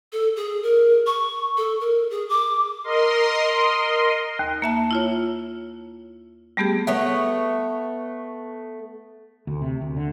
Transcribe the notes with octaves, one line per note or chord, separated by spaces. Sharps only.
A4
G#4
A#4
C#6
A4
A#4
G#4
D6
A#4 D#5 C6
D#2
A#3 E5 A5
E4 F4 C#5
G3 A3 B3 G4 G#4
A3 B3 C#5
D2
C3
D2
D3